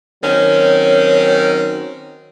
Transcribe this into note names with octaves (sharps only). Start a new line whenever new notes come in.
D#3 F#3 C4 C#4